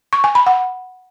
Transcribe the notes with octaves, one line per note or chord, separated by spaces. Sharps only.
C#6
G#5
B5
F#5